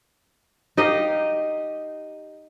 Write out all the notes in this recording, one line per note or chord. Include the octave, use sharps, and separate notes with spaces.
D#4 G4 D#5 F5